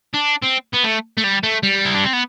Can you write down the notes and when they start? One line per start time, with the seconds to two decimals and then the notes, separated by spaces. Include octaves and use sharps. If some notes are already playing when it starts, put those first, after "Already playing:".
0.14 D4
0.43 C4
0.74 B3
0.84 A3
1.18 A3
1.24 G3
1.43 A3
1.63 G3
1.85 E4
1.94 D4
2.04 C4
2.13 B3